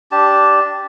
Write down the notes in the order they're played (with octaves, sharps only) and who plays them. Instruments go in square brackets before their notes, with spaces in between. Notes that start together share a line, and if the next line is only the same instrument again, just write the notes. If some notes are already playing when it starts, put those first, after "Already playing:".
[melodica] D4 G4 A5